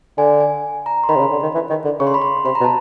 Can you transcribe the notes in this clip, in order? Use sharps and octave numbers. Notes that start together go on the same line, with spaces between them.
D3 G#5
G#5
A#5
C6
D#3 B5
C3
C#3
D3
D#3
E3
D#3
D3
C#3 C#6
C6
B5
C6
C3 B5
A#5
B2
A5